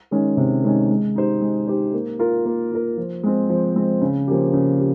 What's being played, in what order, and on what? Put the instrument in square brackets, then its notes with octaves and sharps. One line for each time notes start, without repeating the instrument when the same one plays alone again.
[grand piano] D#3 G#3 C#4
C3
D#3 G#3 C#4
G#3
D#4 G4 C5
G#3
D#4 G4 C5
A#3
F4 A#4
A#3
F4 A#4
F3
G#3 C4
F3
G#3 C4
C#3
F3 A#3 C#4 G4
C#3
G4